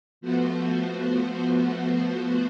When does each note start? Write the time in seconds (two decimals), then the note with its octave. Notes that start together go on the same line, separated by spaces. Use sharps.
0.21 F3 A3 B3 F#4 C5